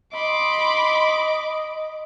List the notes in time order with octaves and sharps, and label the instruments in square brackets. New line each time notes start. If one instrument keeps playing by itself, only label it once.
[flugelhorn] D#5 [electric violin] B5 C6 [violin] D6